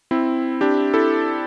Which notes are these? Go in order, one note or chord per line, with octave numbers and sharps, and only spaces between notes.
C4 E4
D4 G4
E4 A4